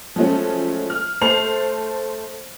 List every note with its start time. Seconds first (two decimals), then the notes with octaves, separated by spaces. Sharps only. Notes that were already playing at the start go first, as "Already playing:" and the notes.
0.16 F3 F#3 G#3 A3 C#4
0.90 F6
1.21 A3 C5 A5 C7 F7